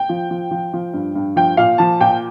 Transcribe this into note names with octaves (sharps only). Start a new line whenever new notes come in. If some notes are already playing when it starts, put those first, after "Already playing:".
Already playing: G5
F3
F3
F3
F3
G2
G2
F3 G5
A#2 F5
F3 A5
A#2 G5